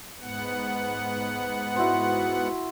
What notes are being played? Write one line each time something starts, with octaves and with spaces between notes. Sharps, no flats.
G#2 B3 F#5
E4 F#4 C5